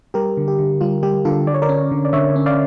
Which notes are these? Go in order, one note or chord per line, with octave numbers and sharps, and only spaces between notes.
G3 G4 A#4
D3
G4
D3
G3 F4
G3 G4
D3 F4 A4
D3 D5
C#5
A#4 D5
C#4
D3
D5
D3 C#5 E5
C#4
D5 F5